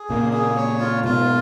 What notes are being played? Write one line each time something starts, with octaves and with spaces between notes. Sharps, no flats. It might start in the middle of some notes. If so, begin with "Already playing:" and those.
Already playing: G#4
A#2 C#3 A#3
G#4
C#5
F4
G#2 B2 F4